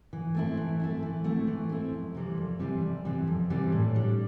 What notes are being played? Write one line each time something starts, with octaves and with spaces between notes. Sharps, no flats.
E3
A3 C4 E4
E3
A3 C4 E4
E3
A3 C4 E4
E3
A3 C4 E4
F2
C3 E3 G3 C4
F2
C3 E3 G3 C4
F2
C3 E3 G3 C4
F2
C3 E3 G3 C4
A2
G3 D4